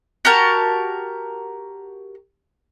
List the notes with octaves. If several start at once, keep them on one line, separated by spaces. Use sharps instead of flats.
F#4 G4 A#4 A5